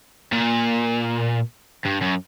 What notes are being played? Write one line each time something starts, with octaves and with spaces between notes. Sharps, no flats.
A#2
G2
F#2